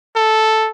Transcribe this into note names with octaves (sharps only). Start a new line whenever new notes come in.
A4